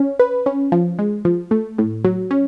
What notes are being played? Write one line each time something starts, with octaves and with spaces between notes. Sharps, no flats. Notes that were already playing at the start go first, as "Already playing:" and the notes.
Already playing: C#4
B4
C#4
F3
G#3
F3
A3
A2
F#3
C#4